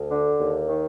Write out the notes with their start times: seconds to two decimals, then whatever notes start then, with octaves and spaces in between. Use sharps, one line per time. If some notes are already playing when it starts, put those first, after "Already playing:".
Already playing: D2
0.09 D3
0.40 D#2
0.69 D#3